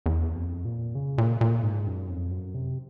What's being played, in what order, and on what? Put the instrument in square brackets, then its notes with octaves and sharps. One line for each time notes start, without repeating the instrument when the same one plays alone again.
[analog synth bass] E2
F2
A#2
C#3
A#2
A#2
G#2
F#2
F2
F#2
C3